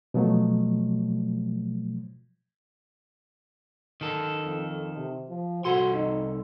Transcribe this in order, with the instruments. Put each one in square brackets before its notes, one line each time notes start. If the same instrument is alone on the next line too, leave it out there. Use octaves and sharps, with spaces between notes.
[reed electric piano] B2 F3 F#3 A3
[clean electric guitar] D#3 A4
[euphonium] F2
C3
F3
[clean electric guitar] C2 A4 C6 [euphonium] F#4
[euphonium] D#4